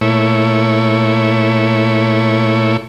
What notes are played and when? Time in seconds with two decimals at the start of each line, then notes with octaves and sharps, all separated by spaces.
0.01 A#2 A3 E4 C#5